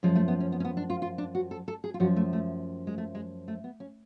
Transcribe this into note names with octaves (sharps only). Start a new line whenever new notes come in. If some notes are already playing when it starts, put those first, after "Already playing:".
F#2 F3 G#3
A3
B3
C#4
B3
C#4
B3
D4
F4
F4
D4
F#4
A4
A4
G#4
F4
F#2 F3 F#4
A3
A3
G#3
A3
G#3
A3
B3
C#4